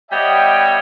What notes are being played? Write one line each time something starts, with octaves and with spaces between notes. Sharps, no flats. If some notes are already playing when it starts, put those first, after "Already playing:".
G3 B3 C#5 D#5 E5 G5